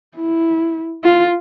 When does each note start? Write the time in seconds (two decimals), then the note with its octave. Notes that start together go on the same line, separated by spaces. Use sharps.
0.16 E4
1.04 F4